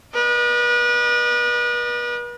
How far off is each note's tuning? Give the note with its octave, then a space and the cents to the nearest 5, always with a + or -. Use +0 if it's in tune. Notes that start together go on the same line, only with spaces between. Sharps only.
B4 -35 D#5 -45